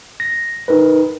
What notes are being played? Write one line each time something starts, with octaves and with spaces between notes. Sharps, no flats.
A#6
D#4 A#4 B4